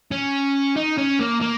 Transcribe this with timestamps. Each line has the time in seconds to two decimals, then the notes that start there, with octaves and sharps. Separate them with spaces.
0.11 C#4
0.76 D#4
0.98 C#4
1.19 A#3
1.41 A#3